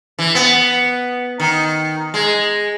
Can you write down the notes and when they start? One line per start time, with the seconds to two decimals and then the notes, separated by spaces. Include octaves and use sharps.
0.19 E3
0.35 B3
1.40 D#3
2.14 G#3